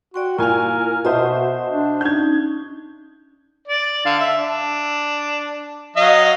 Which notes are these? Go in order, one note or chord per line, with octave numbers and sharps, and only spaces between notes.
F#4 D5 G5 C6
A#2 E4 A#4 F5 G#5
B2 F#4 C5 D#5 E5 A5 D#6
D4
C#4 D#4 G6 G#6
D5
D3 F5
E5
D4
F#3 D#5 F5